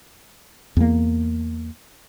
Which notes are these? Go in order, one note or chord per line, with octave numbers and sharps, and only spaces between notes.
E2 A#3